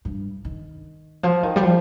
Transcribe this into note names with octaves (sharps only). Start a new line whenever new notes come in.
G2
D#3
F3
D#3
G3
F3